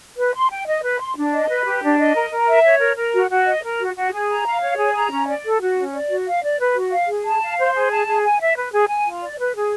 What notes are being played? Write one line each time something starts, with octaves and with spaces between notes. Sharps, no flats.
B4
C6
G5
D#5
B4
C6
D4
D#5
B4
G4
D4
D#5
A#4
A#4
E5
C#5
A#4
A#4
F#4
F#4
D#5
A#4
F#4
F#4
G#4
A#5
F5
C#5
G#4
A#5
C#4
D5
A4
F#4
C#4
D5
F#4
F5
D5
B4
F#4
F5
G#4
A5
F5
C5
G#4
A5
G#4
G#5
E5
B4
G#4
G#5
F4
D5
B4
G#4